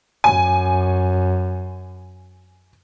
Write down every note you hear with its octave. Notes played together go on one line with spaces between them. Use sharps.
F#2 G#5